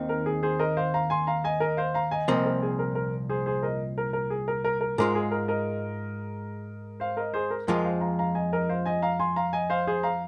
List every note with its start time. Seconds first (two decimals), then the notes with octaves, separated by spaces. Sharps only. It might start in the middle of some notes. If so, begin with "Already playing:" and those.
Already playing: D#2 D#3 C4 D#4
0.09 A#4
0.26 G#4
0.43 G#4 C5
0.59 A#4 D#5
0.77 C5 F5
0.94 F5 A#5
1.10 G#5 C6
1.27 F5 A#5
1.44 D#5 G#5
1.60 A#4 D#5
1.77 C5 F5
1.94 F5 A#5
2.11 D#5 G#5
2.28 C2 A#2 F3 C4 A#4 D#5
2.46 A#4
2.62 G#4
2.79 A#4
2.95 A#4
3.29 G#4 C5
3.46 G#4 C5
3.63 A#4 D#5
3.98 A#4
4.13 A#4
4.30 G#4
4.48 A#4
4.64 A#4
4.81 A#4
4.98 G#2 G#3 F4 A#4
5.15 G#4
5.31 A#4
5.48 A#4 D#5
7.00 C5 F5
7.17 A#4 D#5
7.34 G#4 C5
7.51 A#4
7.68 F2 F3 G#3 F4 A#4 D#5
7.85 C5 F5
8.01 F5 A#5
8.19 F5 A#5
8.35 D#5 G#5
8.53 A#4 D#5
8.69 C5 F5
8.86 D#5 G#5
9.02 F5 A#5
9.20 G#5 C6
9.36 F5 A#5
9.53 D#5 G#5
9.70 C5 F5
9.87 G#4 C5
10.03 F5 A#5